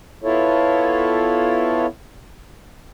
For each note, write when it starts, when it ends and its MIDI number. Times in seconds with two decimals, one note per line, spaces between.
0.24 1.86 59
0.24 1.86 64
0.24 1.86 65
0.24 1.86 69
0.24 1.86 73